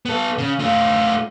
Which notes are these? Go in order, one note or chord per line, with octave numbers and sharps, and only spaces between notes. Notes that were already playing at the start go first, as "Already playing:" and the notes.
B3 A4
C#3
A3 F4